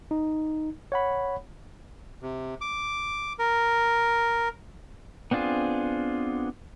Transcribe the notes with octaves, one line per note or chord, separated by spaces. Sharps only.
D#4
C#5 F#5 B5
C3
D6
A#4
B3 C4 D4 F4 G#4